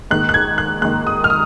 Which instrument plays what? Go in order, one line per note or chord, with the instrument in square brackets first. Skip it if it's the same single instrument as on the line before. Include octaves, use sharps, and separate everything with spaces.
[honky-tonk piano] G#2 D#3 A#3 F#6
F#6
G#6
F#6
G#2 F#6
D#3 A#3
D#6
F6
D#6